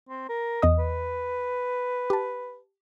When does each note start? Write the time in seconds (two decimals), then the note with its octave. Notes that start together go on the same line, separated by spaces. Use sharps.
0.09 C4
0.29 A#4
0.62 E2 D#5 D#6
0.79 B4
2.10 G4 A5